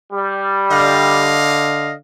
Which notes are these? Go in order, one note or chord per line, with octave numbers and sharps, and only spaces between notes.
G3
D3 D#5 F5